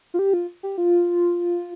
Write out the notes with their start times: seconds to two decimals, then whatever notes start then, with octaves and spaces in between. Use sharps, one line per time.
0.14 F4
0.19 G4
0.33 F4
0.63 G4
0.78 F4